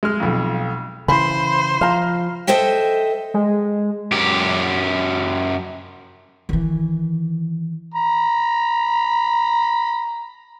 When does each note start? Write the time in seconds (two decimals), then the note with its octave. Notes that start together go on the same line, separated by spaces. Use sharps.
0.03 G#3 F6
0.20 B1 F2
1.08 C#3 E3 C5 B5
1.81 F3 F5 A#5
2.47 A4 C5 D#5 E5 G5
3.34 G#3
4.12 F#2 G4
6.49 D#3 E3
7.94 A#5 B5